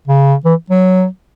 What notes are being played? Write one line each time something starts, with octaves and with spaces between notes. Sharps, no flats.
C#3
E3
F#3